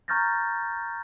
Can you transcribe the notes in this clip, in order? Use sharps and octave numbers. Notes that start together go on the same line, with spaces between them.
A#5 C#6 F6 G6 A6 A#6